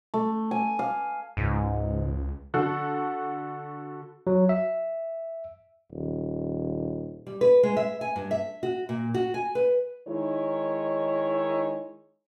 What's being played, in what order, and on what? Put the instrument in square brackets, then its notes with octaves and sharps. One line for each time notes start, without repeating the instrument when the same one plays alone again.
[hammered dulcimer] A3
G#5
F5
[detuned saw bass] C#2 [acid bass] G#2
[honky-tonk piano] D3 F#4 A4
[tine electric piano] F#3
E5
[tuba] D#1
[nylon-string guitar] G3
B4
G#3
E5
G#5
G2
E5
F#4
A#2
F#4
G#5
B4
[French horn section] D#3 G#3 D#4 E4 C#5